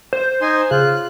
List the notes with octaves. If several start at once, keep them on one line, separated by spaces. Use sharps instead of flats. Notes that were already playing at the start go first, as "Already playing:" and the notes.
C5
D#4 G#5 C6
C#3 F4 F#6